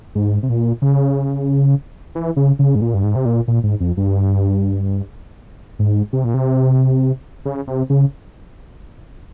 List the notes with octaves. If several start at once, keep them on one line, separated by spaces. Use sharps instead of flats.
G#2
C3
A#2
C#3
E3
C#3
C#3
G#2
A#2
G2
G#2
C3
A#2
A#2
G#2
F2
G2
G#2
C3
A#2
C3
C#3
C3
C#3